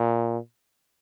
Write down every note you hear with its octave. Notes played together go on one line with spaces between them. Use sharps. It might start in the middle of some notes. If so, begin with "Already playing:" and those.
Already playing: A#2